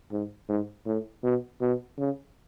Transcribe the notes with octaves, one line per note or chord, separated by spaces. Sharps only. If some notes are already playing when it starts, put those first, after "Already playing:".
G#2
G#2
A2
B2
B2
C#3